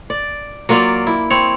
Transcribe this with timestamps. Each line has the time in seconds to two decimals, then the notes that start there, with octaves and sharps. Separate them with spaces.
0.10 D5
0.69 F#3 A#3 F4 D5
1.07 E4
1.30 C4 C#5